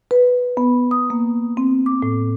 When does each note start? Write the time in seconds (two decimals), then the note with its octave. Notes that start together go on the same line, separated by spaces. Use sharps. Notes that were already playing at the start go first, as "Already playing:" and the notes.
0.11 B4
0.57 B3
0.91 D#6
1.10 A#3
1.57 C4
1.86 D6
2.03 A2